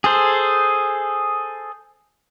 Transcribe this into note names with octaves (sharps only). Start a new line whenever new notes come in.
G#4 A4 C5